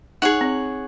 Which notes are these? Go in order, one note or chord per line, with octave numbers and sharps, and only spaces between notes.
D#4 G#4 C#5 F#5
C4